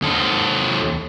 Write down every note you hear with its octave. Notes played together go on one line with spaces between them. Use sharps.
D#2 A4